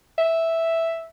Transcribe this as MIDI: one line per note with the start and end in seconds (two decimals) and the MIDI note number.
0.18 1.06 76